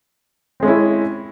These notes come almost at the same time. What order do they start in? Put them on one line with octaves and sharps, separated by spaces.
C4 G#3 C#4 E4